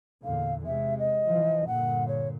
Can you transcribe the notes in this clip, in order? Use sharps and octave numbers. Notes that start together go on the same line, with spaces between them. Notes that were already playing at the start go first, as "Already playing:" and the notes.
E2 A#2 D3 F5
C3 G#3 E5
D#5
E3 F3
G2 A#2 D3 F#5
C#5